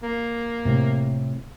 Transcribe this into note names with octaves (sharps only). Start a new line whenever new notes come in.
A#3
A2 C3